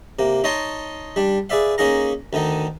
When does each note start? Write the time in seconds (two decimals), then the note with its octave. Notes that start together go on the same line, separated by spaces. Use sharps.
0.19 C3 A#3
0.44 D#4 C#5 D#5 A5 C6
1.16 G3 D4
1.49 G#4 B4 D5 E5 F5
1.78 A#3 C#4 D#4 G#4 F5 A#5
2.33 D2 D3 D#3 D#4